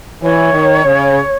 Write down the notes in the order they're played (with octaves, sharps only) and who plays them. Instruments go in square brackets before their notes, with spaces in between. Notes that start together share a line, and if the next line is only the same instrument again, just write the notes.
[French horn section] E3 [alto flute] C#5
[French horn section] D#3
C#3